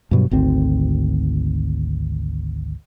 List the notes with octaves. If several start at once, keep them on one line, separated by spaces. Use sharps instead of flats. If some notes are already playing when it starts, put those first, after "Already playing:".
G2 B2 F#3
G#1 D2 C4